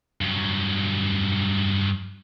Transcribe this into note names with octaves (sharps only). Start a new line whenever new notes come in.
G2 F#3